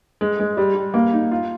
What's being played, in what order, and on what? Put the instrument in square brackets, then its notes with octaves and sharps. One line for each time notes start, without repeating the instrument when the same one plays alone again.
[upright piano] G#3
G#3
G3
G3
A#3
D#4
F4